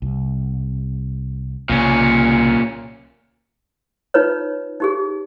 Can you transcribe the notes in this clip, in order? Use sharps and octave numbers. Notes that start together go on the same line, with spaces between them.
C2
C2 A#2 C#3 A#3 C#4
D#4 F4 B4 C#5
D#4 G4 G#4